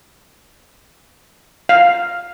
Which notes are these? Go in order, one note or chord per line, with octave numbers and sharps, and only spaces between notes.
F5